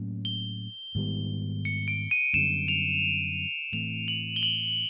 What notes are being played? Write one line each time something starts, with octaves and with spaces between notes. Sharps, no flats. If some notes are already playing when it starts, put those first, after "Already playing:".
Already playing: A2 F#3 A#3 C#4
G7
G#2 D#3 G3 B3
C#7
D7
D#7
F#2 D3 G3 B3 E7
F7
A2 E3 A3 C4 F7
F#7
G7
F#7